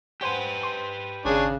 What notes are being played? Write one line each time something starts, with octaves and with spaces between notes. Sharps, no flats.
G4 B4 C5 F#5 G#5
C6
G#1 C#3 D4 G#4 C#5